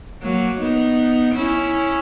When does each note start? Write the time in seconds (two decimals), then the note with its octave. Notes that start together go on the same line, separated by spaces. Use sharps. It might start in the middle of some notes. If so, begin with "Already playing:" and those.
0.22 F#3 A#3
0.59 B3 D#4
1.35 C#4 E4